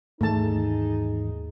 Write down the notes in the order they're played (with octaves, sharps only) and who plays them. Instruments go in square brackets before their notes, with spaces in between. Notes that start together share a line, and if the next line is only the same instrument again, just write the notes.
[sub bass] D#2 [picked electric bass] G#2 D#3 E3 [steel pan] A3 A5 [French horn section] D#4 G#4